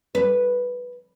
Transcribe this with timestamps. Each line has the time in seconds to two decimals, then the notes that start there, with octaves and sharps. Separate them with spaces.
0.15 B4